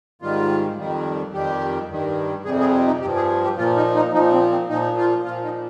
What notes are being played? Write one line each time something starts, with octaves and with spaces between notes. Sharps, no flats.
G#2 D#3 G3 F4
F2 D#3 G3
F2 D#3 G3 G4
G2 D#3 G3
F2 C3 G3 G#4
G#4
D#4
G2 F3 G4
G#4
G4
A#2 F3 F4
D#4
D#4
A#2 F3 D#4
C4
C4
A#2 F3 D#4
F4
A#2 F3 F4
D#4